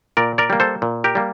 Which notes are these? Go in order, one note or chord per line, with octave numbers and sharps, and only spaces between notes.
A#2 A#4 D5
A#4 D5
G3 A#3
A4 C5
A#2
G4 A#4
G3 A#3